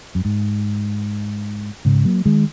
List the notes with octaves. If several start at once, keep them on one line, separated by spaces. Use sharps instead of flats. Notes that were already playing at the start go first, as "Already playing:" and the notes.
F#2
G#2
G#2 C#3
F#3 A#3
D#3 G#3